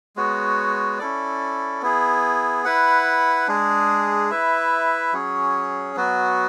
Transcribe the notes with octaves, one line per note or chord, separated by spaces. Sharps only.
G#3 B3 F#4 C#5
C#4 E4 A4 D5
B3 E4 G#4
E4 B4 F#5
G#3 D4 G#4
E4 B4 E5
F#3 C#4 G#4 C#5
F#3 B3 F#4